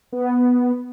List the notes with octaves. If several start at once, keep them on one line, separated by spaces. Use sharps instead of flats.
B3